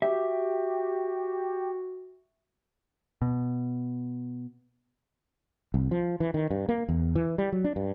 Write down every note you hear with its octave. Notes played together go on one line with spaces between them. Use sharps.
F#4 G4 E5
B2
C2
F3
E3
D#3
G2
A#3
E2
E3
G3
F#3
D4
G2